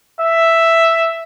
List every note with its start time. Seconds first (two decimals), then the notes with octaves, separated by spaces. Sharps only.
0.21 E5